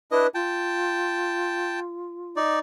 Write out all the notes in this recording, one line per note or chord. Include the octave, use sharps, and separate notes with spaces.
D4 E4 B4 D#5
F4 G5 A5
D#4 D5